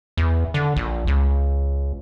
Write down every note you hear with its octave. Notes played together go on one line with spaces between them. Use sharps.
E2
D3
A#1
C#2